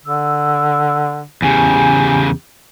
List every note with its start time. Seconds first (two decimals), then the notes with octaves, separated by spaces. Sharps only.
0.06 D3 E6
1.42 E2 C#3 G4 G#5